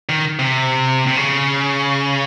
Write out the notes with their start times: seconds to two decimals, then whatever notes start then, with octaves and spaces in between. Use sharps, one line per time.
0.09 D#3
0.39 C3
1.07 C3
1.16 C#3